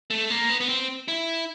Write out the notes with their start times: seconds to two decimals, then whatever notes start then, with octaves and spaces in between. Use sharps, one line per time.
0.10 A3
0.30 A#3
0.50 B3
0.60 B3
0.69 C4
1.08 E4